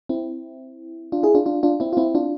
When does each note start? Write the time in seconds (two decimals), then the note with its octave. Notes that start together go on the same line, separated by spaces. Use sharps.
0.09 C4 E4
1.12 D4 F4
1.23 E4 G#4
1.35 D4 F4
1.46 D4 F4
1.63 D4 F4
1.80 C4 E4
1.93 F4
1.97 C4 E4
2.15 D4 F4